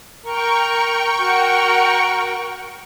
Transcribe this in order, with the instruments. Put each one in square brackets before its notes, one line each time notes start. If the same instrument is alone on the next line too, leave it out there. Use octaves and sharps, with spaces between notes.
[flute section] A#4 A#5 [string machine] G5 C#6
[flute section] F#4 A#4 F#5